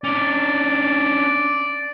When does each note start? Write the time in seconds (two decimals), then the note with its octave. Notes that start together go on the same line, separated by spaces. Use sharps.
0.04 C#4 D4 D5